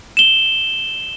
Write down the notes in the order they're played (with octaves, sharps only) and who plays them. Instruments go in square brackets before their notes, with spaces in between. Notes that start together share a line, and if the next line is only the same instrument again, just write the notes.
[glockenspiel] E7 G7